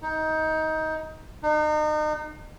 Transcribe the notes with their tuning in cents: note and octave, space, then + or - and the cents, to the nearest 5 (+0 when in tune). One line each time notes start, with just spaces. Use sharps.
D#4 +20
D#4 -35